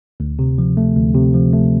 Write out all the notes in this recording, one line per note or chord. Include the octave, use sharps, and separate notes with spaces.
D2
C3
F3
A3
D2
C3
F3
A3